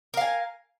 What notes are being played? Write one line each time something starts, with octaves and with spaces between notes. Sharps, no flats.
A#4 F5 G#5